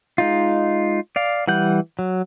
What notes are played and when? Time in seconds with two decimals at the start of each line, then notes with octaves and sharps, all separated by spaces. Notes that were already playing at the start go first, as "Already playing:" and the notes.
0.18 G#3 D#4 F4
1.16 D5 F5
1.48 E3 G3 F#5 G6
1.99 F#3